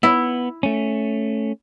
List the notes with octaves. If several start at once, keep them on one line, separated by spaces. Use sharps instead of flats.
B3 E4
A3 C#4